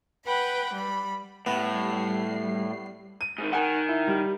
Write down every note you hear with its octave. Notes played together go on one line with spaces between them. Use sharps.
B4 F#5 G5 B5
G3 B5
A2 G3 B3 C7
D#7
G#2 D#3
D#3 F#5 G#5
E4
G3